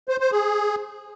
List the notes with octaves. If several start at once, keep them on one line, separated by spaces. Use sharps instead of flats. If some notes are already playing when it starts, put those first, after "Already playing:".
C5
C5
G#4